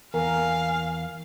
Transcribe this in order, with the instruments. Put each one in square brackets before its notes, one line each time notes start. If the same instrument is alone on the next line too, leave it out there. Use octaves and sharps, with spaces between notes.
[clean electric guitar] E2 [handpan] A#4 [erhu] F5 [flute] G#5